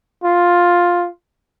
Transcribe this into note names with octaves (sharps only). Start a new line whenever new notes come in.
F4